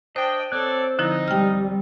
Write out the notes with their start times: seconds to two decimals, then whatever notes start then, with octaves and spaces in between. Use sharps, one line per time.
0.16 D4 C5 D#5 G5
0.52 C4 A4 C#5 D5 F#6
0.99 D3 F3 D#4 E4
1.28 G3 G5 F6